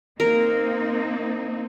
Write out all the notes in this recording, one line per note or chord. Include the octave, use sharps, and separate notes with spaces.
A#3 C4 D#4 A#4